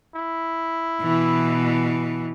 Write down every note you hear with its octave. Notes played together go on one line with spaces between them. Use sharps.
E4
B2 E3